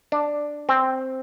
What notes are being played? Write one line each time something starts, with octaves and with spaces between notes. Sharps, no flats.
D4
C4